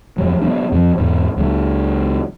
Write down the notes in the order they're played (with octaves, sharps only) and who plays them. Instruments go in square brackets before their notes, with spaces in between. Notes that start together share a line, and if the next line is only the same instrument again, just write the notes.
[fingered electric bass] G1 F2 F#3
F#3 B3 D4
F2 F3
E2 G#2
C#2 F#3